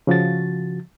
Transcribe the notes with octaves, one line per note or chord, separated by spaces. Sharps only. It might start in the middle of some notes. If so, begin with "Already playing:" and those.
C#3 F3 F#4 A6